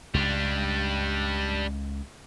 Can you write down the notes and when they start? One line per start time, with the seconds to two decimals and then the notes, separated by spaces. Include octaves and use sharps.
0.14 C#2 G3 D4